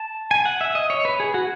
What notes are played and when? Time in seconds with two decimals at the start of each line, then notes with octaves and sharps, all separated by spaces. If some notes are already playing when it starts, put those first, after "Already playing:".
Already playing: A5
0.31 G#5
0.45 F#5
0.61 E5
0.75 D#5
0.90 C#5
1.05 B4
1.20 G#4
1.34 F#4